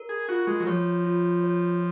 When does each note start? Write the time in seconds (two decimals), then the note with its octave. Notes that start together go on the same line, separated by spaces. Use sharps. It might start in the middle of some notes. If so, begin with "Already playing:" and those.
Already playing: A#4
0.09 G#4
0.29 F4 F#4
0.47 G#3
0.60 F#3
0.67 F3 C#5
1.05 F4
1.44 C#5